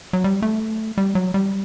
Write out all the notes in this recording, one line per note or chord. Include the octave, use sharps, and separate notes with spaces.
F#3
G3
A3
G3
F#3
G3